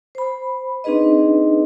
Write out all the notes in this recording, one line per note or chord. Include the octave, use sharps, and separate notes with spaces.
C5 B5
C4 D4 D#4 G#4 B4 D#5